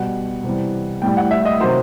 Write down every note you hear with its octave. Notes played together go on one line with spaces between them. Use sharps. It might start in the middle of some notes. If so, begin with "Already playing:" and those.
Already playing: B2 G3 F#5
C3 E3 G3
A2 G3 G5
F#5
E5
D#5
C3 D#3 F#3 C5